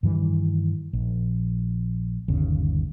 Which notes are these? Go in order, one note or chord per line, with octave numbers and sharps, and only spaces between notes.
G2 D#3 E3 G3
A#1
G1 D#2 C#3